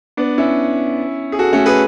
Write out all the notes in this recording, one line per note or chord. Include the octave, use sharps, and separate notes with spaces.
B3 D4
C#4 E4
G#4
F#4 A4
A3 C#4
G#4 B4